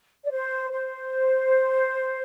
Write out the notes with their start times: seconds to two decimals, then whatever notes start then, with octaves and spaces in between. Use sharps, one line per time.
0.24 D5
0.30 C5
0.71 C5